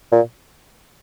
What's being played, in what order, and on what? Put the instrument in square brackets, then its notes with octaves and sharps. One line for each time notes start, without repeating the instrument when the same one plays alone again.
[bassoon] A#2